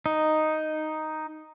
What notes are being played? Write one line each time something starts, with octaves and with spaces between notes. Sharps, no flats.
D#4